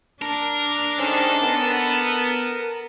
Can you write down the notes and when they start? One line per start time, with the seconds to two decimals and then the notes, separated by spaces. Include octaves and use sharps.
0.22 D4 A#4 A5
0.99 D#3 G#3 C#4 D#4 A4 C5
1.43 B3 A#4